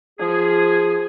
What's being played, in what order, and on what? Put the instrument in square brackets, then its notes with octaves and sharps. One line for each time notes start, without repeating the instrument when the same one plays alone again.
[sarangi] F3 [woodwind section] G#4